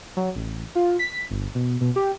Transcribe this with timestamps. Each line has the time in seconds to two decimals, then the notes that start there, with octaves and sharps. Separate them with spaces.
0.17 F#3
0.36 A1
0.75 F4
0.99 B6
1.31 G1
1.55 B2
1.81 B2
1.96 G4